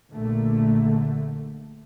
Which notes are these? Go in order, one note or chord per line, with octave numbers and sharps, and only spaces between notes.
A#1 A#2 D3 A3